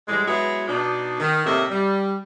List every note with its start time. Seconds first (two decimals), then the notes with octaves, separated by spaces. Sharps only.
0.08 A2 E3 G3 G#3
0.28 F#3 G#3 B3 E4 F#4 G#4
0.68 B2 D4 D#4
1.20 D#3
1.45 A2 C3 A#3 D#5 E5
1.70 G3